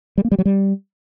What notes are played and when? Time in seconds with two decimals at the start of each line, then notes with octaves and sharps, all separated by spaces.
0.18 G3
0.25 A#3
0.32 G3
0.39 F#3
0.45 G3